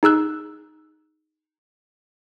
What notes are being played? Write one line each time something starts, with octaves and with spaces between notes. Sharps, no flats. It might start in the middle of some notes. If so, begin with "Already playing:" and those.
D#4 G#4 E6 F#6